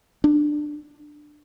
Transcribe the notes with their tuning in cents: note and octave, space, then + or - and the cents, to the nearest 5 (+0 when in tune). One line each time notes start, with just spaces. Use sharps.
D4 +20